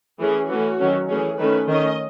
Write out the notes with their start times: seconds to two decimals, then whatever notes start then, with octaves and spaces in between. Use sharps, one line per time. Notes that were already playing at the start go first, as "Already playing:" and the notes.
0.20 E3 A3 C#4 G#4
0.49 E3 A3 C#4 F#4
0.79 D#3 F#3 C#4
1.09 E3 A3 C#4 G#4
1.39 D#3 A3 C#4 B4
1.69 D#3 A3 C#4 D#5